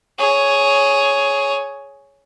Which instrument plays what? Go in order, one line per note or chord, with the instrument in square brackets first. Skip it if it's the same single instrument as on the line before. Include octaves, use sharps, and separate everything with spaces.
[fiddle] G#4 C#5